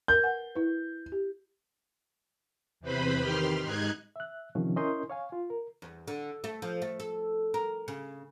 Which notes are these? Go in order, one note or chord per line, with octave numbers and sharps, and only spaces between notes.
A#4 G6
B4 F#5 G#5
E4 B4
G4
E2 C3 B4 C5 B5
D#3 G4 C6 F6
G#2 D#4 F#6 G#6
E5 F#6
C3 D#3 F3 C#4
C#4 E4 A#4 D#5 C6 G6
C#5 F5 G#5
F4
A#4
E2
D3
A3
F3
A3
A4
A#4
C#3